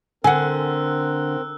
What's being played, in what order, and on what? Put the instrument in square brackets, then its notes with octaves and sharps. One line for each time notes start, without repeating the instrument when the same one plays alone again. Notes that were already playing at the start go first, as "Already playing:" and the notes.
[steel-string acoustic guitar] D3 [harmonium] C4 A#4 [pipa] F#5 G#5 [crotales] E6 F#6